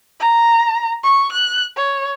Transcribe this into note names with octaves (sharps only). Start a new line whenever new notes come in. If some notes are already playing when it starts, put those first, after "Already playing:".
A#5
C#6
F#6
C#5